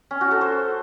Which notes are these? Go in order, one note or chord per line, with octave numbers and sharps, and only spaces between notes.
C#4
F#4
A4
C5